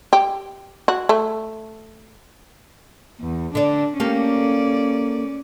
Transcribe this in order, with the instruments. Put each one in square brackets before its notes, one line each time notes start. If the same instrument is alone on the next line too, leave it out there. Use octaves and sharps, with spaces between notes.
[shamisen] G4
F#4
A3
[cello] E2
[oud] D3 D5 [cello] D4
[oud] A#3 G4 A4 [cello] C#4 D5